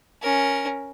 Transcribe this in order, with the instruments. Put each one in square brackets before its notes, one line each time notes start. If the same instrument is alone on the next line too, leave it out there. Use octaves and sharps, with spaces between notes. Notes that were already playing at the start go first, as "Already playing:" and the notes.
[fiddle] C#4 A#4